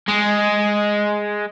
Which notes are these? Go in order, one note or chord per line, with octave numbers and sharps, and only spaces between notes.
G#3